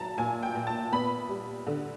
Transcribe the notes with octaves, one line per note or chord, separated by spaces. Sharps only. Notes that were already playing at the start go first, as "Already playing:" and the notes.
Already playing: F#3 A5 A#5
A#2 G#5
G5
A#2
A5
B3 B5
G3
D3